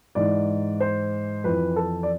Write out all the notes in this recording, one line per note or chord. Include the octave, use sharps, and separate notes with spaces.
G#2 E3 D5
C5
F2 E3 B4
A4
D5